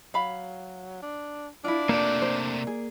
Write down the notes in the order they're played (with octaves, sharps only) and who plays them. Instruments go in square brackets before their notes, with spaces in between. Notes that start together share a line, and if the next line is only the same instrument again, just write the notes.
[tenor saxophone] F#3 [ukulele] F5 B5
[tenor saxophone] D4
[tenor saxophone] D4 [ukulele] E4 F4
[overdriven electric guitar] C3 A3 [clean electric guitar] A#3 D5
[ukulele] C5
G#4